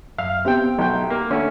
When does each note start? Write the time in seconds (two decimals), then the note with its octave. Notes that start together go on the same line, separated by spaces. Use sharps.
0.18 F#2 E5 F5 F6
0.45 B3 C4 G4 E5 G5
0.79 B1 G5
1.10 A#3
1.30 D3 A3 C#4